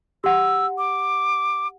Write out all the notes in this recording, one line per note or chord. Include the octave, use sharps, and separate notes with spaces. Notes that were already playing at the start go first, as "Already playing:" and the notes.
G4 F#5 E6
D6